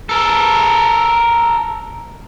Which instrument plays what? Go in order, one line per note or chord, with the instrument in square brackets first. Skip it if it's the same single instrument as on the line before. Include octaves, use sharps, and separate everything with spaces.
[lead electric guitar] A4 A#4